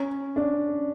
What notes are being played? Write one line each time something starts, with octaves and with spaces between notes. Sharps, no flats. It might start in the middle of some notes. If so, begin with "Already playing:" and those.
Already playing: C#4
D4